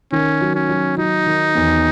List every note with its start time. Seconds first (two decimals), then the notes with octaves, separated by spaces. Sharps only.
0.12 D#3 C#4
0.41 F#3
0.55 C#4
0.69 F#3
0.98 F#3 D#4
1.26 D#3
1.55 E2